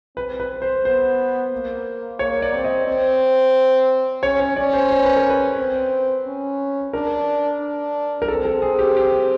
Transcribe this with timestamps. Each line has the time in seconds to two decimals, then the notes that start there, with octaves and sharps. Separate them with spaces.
0.16 C4 B4
0.40 B4
0.62 C5
0.85 B3 C5
1.52 A#3
2.19 A#3 C#5
2.42 D5
2.53 C4
2.64 D#5
2.87 C4
4.23 C#4 C#5
4.40 C#5
4.56 C#4 D5
4.73 C5
4.91 C5
5.04 B4
5.16 A#4
5.30 B4
5.58 C4
6.26 C#4
6.93 D4 A#4
7.60 D4
8.22 A#4
8.28 C4 A4
8.45 A4
8.62 G#4
8.79 G4
8.97 G4